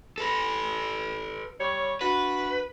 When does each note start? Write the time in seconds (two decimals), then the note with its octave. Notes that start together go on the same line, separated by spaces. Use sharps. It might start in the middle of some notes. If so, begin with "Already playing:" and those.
0.18 A4 B4
1.60 G3 C#5
2.01 D4 E4 F#4 B4